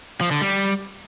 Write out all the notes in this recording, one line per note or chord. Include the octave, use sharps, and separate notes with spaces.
F3
D3
G3